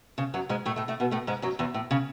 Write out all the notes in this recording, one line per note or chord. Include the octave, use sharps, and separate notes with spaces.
C#3
F#2 F#3
G#2 G#3
A2 A3
A2 A3
A2 A3
B2 B3
A2 A3
G#2 G#3
F#2 F#3
E2 E3
A2
C#3